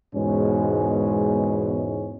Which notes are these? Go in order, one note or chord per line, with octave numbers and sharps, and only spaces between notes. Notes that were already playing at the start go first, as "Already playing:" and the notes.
E2 G#2 B2 G#3 C#4